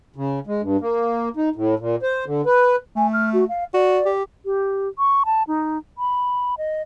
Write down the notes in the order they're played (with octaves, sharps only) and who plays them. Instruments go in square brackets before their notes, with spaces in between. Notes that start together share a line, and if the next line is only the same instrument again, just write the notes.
[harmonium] C#3
G#3
G2
A#3
D#4
A2
A#2
C5
D3
B4
[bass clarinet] A3 [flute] G#5
[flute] F6
F#4
F5
[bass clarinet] F#4 [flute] D5
[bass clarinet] G4
[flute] G4
C#6
A5
D#4
B5
D#5